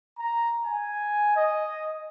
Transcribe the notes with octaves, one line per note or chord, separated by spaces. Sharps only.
A#5
G#5
D#5